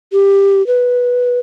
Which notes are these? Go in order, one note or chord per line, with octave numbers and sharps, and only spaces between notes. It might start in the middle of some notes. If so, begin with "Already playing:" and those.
G4
B4